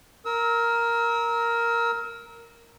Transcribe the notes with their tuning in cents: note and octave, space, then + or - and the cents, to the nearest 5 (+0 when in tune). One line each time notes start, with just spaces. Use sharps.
A#4 +0 E6 -35